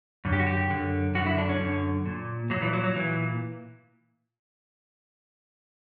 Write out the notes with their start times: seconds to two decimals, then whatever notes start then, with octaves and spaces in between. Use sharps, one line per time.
0.25 F#2 D3
0.33 G4
0.40 F#4
0.47 G4
0.70 F#2 D3
1.15 F#2 D3 F#4
1.26 E4
1.38 D4
1.49 C#4
1.60 F#2 D3
2.06 A#2
2.50 A#2 F#3
2.62 E3
2.73 F#3
2.84 F#3
2.96 A#2 E3